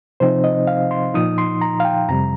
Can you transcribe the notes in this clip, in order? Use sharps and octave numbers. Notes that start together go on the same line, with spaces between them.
C3 F3 C4 D#4 C5
D#5
F5
C6
A#2 F3 D#4 D#6
C6
A#5
F5
G5
F2 C3 G3 A#5